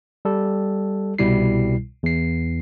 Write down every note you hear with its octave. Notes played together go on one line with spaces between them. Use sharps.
G3 A4
C2 B2 G3 E4 C7
E2 C7